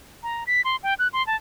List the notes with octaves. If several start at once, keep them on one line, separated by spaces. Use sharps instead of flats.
A#5
B6
C6
G5
F#6
C6
A5